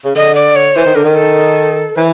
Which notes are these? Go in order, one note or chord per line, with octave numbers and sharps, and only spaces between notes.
C#3
D3 D#5
D5
C#5
E3 C5
D#3
D3 A#4
D#3
A4
E3 C5